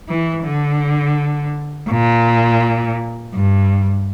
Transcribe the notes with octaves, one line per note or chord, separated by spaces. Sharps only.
E3
D3
A#2
G2